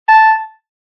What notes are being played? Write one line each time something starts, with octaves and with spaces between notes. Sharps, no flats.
A5